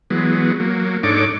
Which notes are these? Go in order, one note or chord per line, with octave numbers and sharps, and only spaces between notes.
E3 F#3 G#3 B3
F#3 A#3
G#2 D4 D#4 A4 C#5 D6